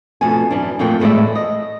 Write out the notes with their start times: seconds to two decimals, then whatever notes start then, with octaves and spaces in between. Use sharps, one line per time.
0.21 F2 B2 A3 D4 G#5
0.51 F#2 E3 D4
0.79 F2 A#2 A3 G5
1.00 E2 A2 G#3 D5 E5
1.35 D#5